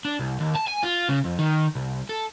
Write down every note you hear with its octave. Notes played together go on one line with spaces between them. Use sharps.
D4
C2
D#2
A5
G#5
F4
C#3
F2
D#3
C2
A4